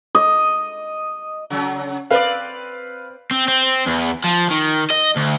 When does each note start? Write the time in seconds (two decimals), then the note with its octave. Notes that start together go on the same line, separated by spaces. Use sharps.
0.15 D#5
1.50 C#3 F#3
2.11 C4 B4 D5 F5
3.31 C4
3.48 C4
3.86 E2
4.24 F3
4.50 D#3
4.90 D#5
5.16 D2